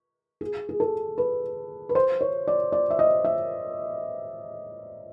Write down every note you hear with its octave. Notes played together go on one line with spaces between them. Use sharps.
G#4
G#4
A4
B4
B4
C5
C#5
D5
D5
E5
D#5
E5